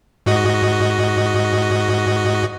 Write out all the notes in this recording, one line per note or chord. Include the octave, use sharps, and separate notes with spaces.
G#2 F#4 D#5